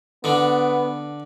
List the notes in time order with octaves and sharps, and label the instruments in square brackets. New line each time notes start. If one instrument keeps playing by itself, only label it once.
[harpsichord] D3 D4 [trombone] B3